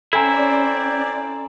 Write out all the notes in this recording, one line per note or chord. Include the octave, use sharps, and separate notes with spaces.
C4 C#4 E4 A4 D5 G#5 A#5